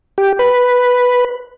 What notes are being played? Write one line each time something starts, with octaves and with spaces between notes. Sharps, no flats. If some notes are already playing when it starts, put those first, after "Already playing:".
G4
B4